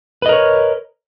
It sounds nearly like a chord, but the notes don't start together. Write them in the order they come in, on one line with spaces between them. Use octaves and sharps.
B4 D#5 A#4 C#5